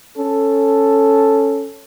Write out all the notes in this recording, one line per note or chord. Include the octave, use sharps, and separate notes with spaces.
C#4 A4